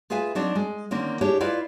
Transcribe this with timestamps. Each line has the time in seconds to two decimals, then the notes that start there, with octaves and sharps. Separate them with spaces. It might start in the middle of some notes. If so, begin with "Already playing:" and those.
0.10 F4 G#4 B4 E5 F5 G#5
0.35 F#3 C4 D4 D#4
0.55 G#3
0.91 D3 D#3 A#3 C4 C#4
1.21 D4 E4 G4 G#4 C#5
1.41 E4 F4 B4 D5 D#5 F5